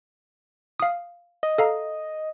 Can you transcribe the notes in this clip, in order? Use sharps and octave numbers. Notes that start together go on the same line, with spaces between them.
F5 D#6
D#5
A4 F5 A#5